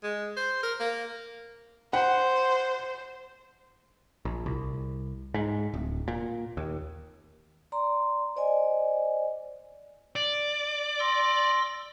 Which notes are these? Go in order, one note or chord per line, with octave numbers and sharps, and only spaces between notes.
G#3
C5
A#4
A#3
C5 F#5
A#1
C2
G#2
D1
A#2
D#2
D5 A#5 C6
C5 D5 D#5 G#5
D5
C6 E6 A#6